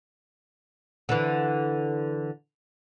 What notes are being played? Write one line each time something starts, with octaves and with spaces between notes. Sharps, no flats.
D3 E3